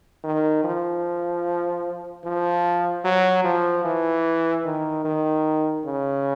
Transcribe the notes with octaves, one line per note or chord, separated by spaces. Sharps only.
D#3
F3
F3
F#3
F3
E3
D#3
D#3
C#3